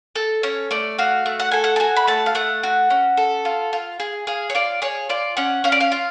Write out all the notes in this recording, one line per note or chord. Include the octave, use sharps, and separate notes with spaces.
A4
C#4 C#5
A3 D5
F#4 F5
A3
F#5
A4 G#5
F#5
A5
F#4 G#5
B5
A3 A5
F5
A3 F#5
F#4
C#4
A4
F4
F4
G#4
G#4 F5
C#5
F4 D5
G#4 C#5
F4 D5
C#4 F#5
C#4 F5
D5
F5
F4